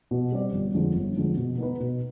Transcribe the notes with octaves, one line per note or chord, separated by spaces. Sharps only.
B2
G3 C4 G4 D5
G1
F2 D3 G#3
G1
F2 D3 G#3
B2
B3 D#4 B4
B2